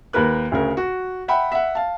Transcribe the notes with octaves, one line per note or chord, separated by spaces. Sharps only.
D#2 A#4 B4 F#6
D2 C#3 A#4
F#4
E5 F#5 G5 B5
E5 F#5
F5 A5